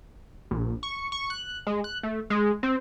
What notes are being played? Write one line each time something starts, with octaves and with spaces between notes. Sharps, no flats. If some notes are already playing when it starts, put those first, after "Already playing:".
A#1
C#6
C#6
F#6
G#3
F#6
A3
G#3
C4